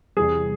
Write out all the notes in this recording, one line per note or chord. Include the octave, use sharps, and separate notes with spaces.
E2 C3 E3 G3 G#4